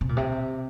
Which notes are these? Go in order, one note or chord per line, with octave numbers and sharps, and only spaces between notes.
C3
A#2
C3